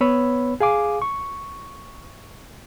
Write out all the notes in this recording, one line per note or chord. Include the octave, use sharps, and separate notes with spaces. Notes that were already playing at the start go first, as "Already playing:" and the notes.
B3 B4 C#5 B5 E6
G#4 F5 G#5 D6
C#6